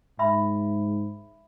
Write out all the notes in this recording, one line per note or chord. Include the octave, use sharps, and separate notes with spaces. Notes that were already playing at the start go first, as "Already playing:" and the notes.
G#2 E5 B5